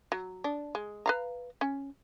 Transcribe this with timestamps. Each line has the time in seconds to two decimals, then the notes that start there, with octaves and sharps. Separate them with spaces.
0.12 F#3
0.44 D4
0.75 G#3
1.06 B4 F5 A#5
1.61 C#4